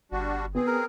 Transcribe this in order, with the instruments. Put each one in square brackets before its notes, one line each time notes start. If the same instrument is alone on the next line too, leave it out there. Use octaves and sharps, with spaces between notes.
[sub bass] G1 [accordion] G3 D4 F#4
[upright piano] B3 [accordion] C4 G#4
[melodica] A#4